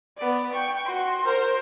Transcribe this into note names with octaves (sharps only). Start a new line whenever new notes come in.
B3 D5
G5 C#6
F#4 C6
A#4 C5